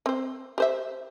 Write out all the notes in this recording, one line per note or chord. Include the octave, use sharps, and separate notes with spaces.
C4 C5
G4 C5 E5